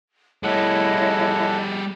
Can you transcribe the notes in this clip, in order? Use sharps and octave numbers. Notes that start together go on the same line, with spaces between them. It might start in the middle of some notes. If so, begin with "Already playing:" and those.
G3 E4 G#4 A4 C#5 D#5 F#5